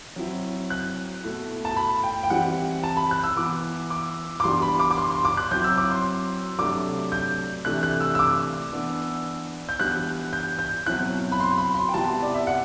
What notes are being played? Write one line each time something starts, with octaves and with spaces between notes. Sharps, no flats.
F#3 C4 E4
F#6
B2 A3 E4
A5
B5
G5
G5
E3 G3 C4 E4 F#5
A5
B5
F#6
E6
E3 B3 E4 D6
D6
D6
E3 G3 B3 D4 C6
B5
D6
D6
C6
C6
D6
F#6
F#3 C4 E4 G6
E6
D6
C6
C3 F#3 A3 D4 D6
G6
C3 E3 A3 D4 F#6
F#6
E6
E6
D6
E3 B3 D4
G6
E3 G3 B3 D4 F#6
G6
G6
B2 F#3 C4 E4 F#6
B5
C6
B5
C6
G5
C3 G3 B3 E4 A5
D5
E5
F#5